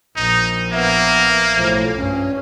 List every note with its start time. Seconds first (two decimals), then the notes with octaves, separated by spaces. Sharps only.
0.16 A#1 D#4
0.73 A#3 B3 E5
1.54 B1 A2 F3
1.97 G2 C#4